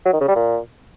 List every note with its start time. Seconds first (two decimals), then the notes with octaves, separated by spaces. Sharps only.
0.06 F#3
0.13 D#3
0.21 C#3
0.28 G3
0.36 A#2